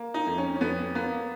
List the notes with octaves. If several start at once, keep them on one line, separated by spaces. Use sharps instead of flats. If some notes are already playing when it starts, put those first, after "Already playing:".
Already playing: A#3
D#4
F2
C#4
C#4
F2 B3
A#3 B3